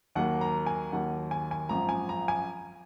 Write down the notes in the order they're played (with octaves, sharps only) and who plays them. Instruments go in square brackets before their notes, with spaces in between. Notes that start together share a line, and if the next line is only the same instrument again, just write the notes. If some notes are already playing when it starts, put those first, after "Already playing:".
[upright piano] D#2 D#3 F#3 A#3 F#5
A#5
G#5
D#2 D#3 F#3 A#3 F#5
G#5
G#5
G#1 F#2 F3 A#5
G#5
A#5
G#5